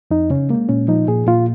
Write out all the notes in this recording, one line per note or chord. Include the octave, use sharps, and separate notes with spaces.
F2 D#4
C#3 C#4
G#3 A#3
A#2 C#4
F3 D#4
A#2 G#4
A#2 F4